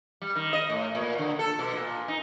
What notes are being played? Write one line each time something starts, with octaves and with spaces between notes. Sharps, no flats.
G3
D#3
D#5
A2
A#2
D3
A4
B2
A#2
D#4